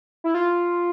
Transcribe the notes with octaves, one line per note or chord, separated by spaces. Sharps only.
E4
F4